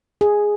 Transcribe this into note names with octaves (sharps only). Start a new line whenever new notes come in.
G#4